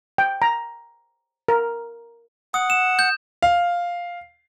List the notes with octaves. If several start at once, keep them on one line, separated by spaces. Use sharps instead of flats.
G5
A#5
A#4
F#5 D#6
E7
G6
F5